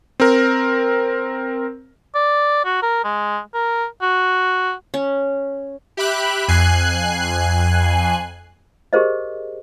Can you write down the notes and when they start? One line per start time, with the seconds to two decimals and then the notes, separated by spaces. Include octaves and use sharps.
0.20 C4 A#4
2.15 D5
2.65 F#4
2.83 A#4
3.04 G#3
3.54 A#4
4.02 F#4
4.94 C#4
5.97 G4 E5 B5 F#6
6.48 F2 G#5 F#6 C7
8.93 G4 G#4 A#4 C5 D#5